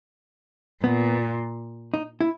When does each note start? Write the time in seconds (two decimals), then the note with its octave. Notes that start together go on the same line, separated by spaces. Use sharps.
0.83 A#2 B3
1.94 D#4
2.21 E4